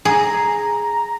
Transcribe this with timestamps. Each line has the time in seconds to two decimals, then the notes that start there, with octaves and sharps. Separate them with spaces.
0.05 G#4 A#5